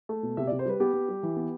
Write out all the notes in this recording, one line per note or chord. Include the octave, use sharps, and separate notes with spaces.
A3
B2
C3 E5
D5
C3
C5
G3 B4
B3 G4
B3
G3
E3
B3